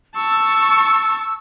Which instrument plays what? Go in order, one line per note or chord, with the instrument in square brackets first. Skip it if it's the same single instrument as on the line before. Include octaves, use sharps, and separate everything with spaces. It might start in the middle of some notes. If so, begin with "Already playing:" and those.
[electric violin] A5 C#6 [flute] E6